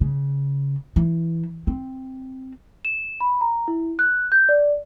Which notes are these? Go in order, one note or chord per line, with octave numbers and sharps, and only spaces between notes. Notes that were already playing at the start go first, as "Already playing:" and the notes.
C#3
E3
C4
E7
B5
A#5
E4
F#6
G6
D5